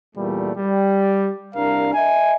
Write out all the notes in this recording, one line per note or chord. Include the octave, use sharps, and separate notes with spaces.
E2 A#2 G3 A3
G3
C2 D4 A#4 F5
D#5 E5 G#5